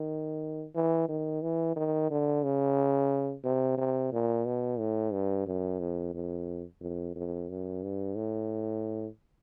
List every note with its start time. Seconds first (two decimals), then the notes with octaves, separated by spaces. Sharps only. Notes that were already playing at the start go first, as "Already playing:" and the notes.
Already playing: D#3
0.75 E3
1.09 D#3
1.42 E3
1.76 D#3
2.11 D3
2.44 C#3
3.44 C3
3.78 C3
4.12 A#2
4.46 B2
4.79 A2
5.13 G2
5.47 F#2
5.80 F2
6.14 F2
6.81 F2
7.15 F2
7.49 F#2
7.83 G2
8.16 A2